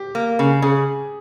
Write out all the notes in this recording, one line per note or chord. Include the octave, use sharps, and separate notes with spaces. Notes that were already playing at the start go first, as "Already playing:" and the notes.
Already playing: G4
A#3
C#3
C#3 G#4